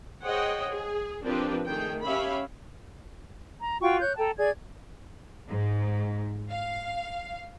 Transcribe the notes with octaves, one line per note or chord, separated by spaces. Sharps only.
G#4 C5 C#5 D#5 F#5 G5
G#4
F3 C4 D4 G4 A#4 B4
D#3 A3 G#4 G5
C#4 G4 C#5 E5 F5 B5
A#5
F4 F#4 G5 C#6
C#5 F#6 G6
A4 G5 A5 A#5
G#4 D5 G#6
G#2
F5